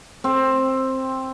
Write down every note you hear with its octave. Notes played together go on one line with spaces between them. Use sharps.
C4